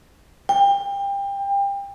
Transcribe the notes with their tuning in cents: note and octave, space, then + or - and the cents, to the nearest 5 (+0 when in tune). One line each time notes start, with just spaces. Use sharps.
G5 +25